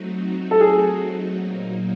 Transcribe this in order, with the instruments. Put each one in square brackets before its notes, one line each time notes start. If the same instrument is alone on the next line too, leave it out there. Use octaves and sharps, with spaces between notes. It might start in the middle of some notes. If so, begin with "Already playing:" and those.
Already playing: [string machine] F#3 A3 C4 D#4 F#4
[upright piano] A4
G#4
[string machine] A#2 F#3 A#3 D#4